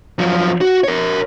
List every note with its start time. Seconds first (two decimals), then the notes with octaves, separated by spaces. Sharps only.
0.19 F#2 F3
0.61 F#4
0.84 A#4 C#5